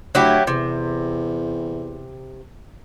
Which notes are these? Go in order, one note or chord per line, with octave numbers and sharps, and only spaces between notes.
D2 F#3 E4 G4
E2 C3